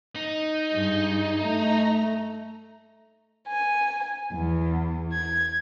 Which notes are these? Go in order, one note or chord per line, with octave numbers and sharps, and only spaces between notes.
D#4
G2 G#3
A3 A#5
G#5
E2
G#6